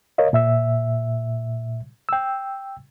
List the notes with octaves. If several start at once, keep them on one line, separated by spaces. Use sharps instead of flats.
A#4 C#5 D#5 F5
A#2 E5 E6
G5 E6